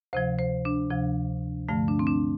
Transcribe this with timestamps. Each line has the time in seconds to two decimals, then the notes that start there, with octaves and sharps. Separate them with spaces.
0.13 D2 C3 F3 C5
0.39 C5
0.65 D4
0.90 D2 C3 F3
1.69 G2 D3 F3 A3
1.88 D4
1.99 C4
2.07 D4